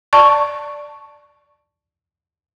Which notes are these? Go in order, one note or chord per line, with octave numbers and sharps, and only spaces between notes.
D5 A5 C#6